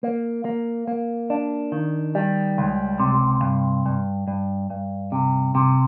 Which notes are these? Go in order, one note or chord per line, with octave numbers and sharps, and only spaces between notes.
A#3
A#3
A#3
D4
D#3
G3
C#2
C3
G2
G2
G2
G2
C3
C3